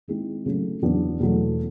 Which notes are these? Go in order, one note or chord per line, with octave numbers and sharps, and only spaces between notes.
D#3 G#3 C4 E4
C#3 F#3 A3
E2 C#3 F#3 B3 D4
E2 B2 F#3 A3